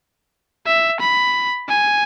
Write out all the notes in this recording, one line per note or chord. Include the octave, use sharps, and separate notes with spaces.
E5
B5
G#5